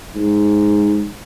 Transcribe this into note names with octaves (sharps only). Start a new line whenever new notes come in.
G#2